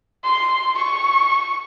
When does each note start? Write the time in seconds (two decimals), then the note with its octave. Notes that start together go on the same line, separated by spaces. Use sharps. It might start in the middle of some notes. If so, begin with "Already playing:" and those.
0.24 C6
0.77 C#6